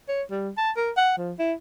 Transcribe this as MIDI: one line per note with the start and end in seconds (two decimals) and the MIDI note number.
0.09 0.23 73
0.31 0.50 55
0.58 0.71 81
0.77 0.91 70
0.97 1.13 78
1.18 1.33 53
1.39 1.54 64